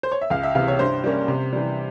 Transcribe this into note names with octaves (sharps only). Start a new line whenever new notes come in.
C5
C#5
E5
C#2 F5
E5
C3 E3 F5
C#5
G2 C5
G3 A#3 C#4
C3
E3 G3